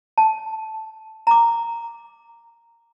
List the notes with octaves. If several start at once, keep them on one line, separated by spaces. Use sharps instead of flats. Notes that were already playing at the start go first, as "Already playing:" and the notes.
A5
A#5 D6